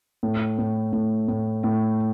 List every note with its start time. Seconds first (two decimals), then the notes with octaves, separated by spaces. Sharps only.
0.23 A2
0.58 A2
0.93 A2
1.28 A2
1.64 A2